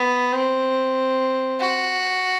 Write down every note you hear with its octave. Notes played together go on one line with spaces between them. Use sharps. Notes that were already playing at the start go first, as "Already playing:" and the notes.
Already playing: B3
C4
F#4